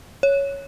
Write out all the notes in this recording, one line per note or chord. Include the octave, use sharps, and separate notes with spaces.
C#5